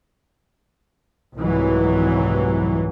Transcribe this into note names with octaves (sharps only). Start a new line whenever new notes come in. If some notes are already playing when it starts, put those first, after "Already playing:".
F1 C2 G#2 E3 F#3